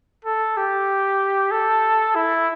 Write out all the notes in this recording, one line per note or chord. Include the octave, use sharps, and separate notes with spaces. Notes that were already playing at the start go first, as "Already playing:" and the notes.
A4
G4
A4
E4